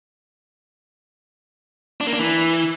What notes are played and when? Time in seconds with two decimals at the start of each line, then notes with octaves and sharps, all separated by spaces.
2.01 D4
2.07 A#3
2.13 D4
2.19 E3